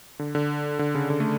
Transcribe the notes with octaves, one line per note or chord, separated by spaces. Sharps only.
D3
D3
D3
C#3
D3
A3